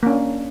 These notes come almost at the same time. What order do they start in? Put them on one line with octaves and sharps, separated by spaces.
A#3 C#4 D4